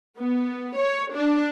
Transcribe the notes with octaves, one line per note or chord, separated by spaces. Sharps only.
B3
C#5
D4